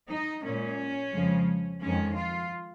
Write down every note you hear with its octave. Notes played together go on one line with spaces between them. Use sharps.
D#4
A#2 G#3 C#4
F2 C#3 F3 G#3
F2 D#3 G#3 C#4
F4